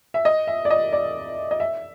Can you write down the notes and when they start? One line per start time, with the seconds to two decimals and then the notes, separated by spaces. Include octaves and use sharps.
0.14 E5
0.25 D#5
0.47 E5
0.65 D5
0.71 D#5
0.93 D5
1.51 D#5
1.60 E5